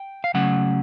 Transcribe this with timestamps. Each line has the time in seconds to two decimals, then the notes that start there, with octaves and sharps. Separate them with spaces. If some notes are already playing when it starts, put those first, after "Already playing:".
Already playing: G5
0.24 F5
0.34 C#3 F#3 A3 C#4 F#5